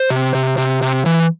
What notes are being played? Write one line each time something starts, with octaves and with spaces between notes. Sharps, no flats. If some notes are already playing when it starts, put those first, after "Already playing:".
Already playing: C5
C3
C3
C3
C3
E3